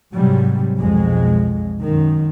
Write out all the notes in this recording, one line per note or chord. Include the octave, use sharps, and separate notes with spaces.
G#2 C3 F#3 G3
B1 F2 G#3
F#2 D#3